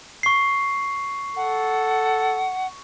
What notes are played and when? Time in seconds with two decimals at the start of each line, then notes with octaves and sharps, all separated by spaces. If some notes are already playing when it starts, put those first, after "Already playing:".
0.23 C#6 C7
1.36 A4 F#5